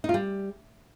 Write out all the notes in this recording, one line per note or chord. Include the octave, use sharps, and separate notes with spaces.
D#4
F4
G3